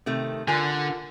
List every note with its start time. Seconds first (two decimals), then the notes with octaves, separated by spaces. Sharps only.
0.06 C3 D#3 A3
0.48 D3 F4 A#4 G#5